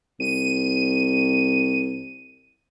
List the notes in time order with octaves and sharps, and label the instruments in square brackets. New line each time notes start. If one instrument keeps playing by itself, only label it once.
[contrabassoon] C2 [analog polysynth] D#7